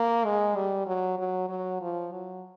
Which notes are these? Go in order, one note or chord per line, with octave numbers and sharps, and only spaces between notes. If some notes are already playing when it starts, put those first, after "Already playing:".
Already playing: A#3
G#3
G3
F#3
F#3
F#3
F3
F#3